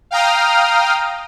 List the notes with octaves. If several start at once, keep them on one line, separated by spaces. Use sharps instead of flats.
F5 G5 A#5 D#6 F6